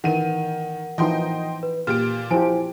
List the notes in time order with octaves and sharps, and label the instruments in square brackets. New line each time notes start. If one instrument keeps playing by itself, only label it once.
[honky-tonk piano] D#3 D#7 [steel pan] E3 [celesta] A#4 F#5
[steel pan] E3 F3 D#4 [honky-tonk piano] D#5 G5 C6
[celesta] B4
[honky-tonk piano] A#2 G4 D7 [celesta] F6
[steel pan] F3 G4 [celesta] E4 C5 G#5 [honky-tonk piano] D7